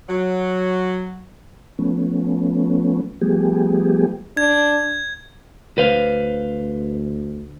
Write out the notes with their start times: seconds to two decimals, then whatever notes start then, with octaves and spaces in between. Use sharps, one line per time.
0.09 F#3
1.79 F3 A3 B3 C#4
3.21 F3 G3 A3 B3 G4 G#4
4.37 D4 G#6
5.78 D2 B4 C5 F5